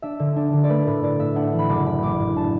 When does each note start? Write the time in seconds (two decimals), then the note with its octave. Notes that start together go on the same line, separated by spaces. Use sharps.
0.02 D4 E5
0.19 D3
0.36 D4
0.53 D3
0.64 D5
0.69 A3 B4
0.86 A2 B4
1.03 A2 D5
1.19 A2 E5
1.36 D4 F#5
1.47 F#5
1.54 E3
1.59 B5
1.69 F#1 D6
1.86 D4 B5
2.03 A1 D6
2.20 A2 D6
2.36 D4 A5